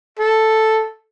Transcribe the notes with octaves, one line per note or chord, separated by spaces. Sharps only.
A4